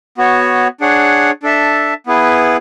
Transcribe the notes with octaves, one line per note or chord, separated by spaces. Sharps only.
B3 F#4 C#5
D4 G#4 C#5 F#5
D4 A4 E5 A5
B3 E4 G#4 B4